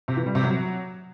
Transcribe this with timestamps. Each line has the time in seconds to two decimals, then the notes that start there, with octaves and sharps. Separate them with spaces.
0.08 C3
0.17 E3
0.26 G3
0.35 C3
0.44 F#3